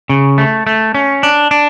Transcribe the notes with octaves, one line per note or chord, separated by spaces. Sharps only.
C#3
A3
A3
C#4
D4
D4